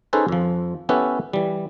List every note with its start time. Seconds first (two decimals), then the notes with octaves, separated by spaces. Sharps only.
0.13 C#4 D#4 G#4 A4 B4 C5
0.28 F2 F3
0.89 B3 C#4 E4 G4 A4 B4
1.33 E3 G3